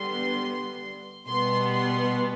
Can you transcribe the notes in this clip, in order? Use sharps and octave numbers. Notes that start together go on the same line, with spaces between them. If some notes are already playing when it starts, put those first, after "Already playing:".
Already playing: D3 G3 B3 C6
B2 G3 B3 C6
C6